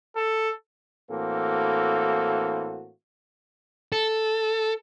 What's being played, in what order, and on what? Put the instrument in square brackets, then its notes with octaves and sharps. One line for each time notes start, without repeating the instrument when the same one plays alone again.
[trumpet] A4
[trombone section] A2 E3 A#3 C4 F#4 A4
[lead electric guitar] A4